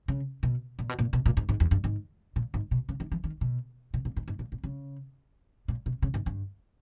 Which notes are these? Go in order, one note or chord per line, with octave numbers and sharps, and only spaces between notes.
C#3
B2
A#2
B2
A#2
B2
A#2
G#2
G#2
E2
G2
G#2
A#2
G#2
B2
C#3
D#3
E3
D#3
B2
B2
A#2
G#2
G#2
A#2
A#2
C#3
A#2
B2
C#3
G#2
G2